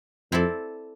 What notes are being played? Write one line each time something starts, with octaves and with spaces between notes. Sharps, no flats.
F2 C4 E4 A4 D5